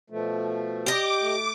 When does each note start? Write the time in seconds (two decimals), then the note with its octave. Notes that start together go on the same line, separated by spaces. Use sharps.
0.10 B2 F3 A3
0.86 G4 D#5 D6
1.21 A3